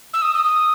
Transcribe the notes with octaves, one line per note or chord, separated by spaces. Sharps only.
E6
D#6
D#6
D#6